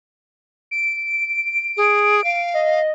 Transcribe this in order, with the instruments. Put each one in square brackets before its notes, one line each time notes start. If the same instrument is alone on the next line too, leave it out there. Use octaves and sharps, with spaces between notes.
[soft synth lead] D7
[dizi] G#4
F5
[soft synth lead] D#5